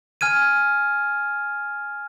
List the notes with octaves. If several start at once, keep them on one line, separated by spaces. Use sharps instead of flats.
G#5 F6 G#6 D#7